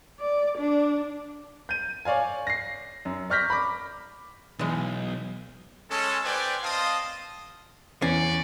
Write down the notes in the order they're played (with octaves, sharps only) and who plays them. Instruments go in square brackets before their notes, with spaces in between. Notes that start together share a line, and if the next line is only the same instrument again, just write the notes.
[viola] D5
D4
[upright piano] G6 D#7
C#5 D5 F5 G#5
A#6 C7
F#2
D5 C#6 F6 G6 A#6 B6
B5 D6
[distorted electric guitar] B1 [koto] E3 G#3
[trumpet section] G#3 C#4 A4
F4 B4 C5 D5 G5 G#5
C4 D#5 F5 A5 C6 D#6
[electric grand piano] E2 E3 C7 [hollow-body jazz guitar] C#4 [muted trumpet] D5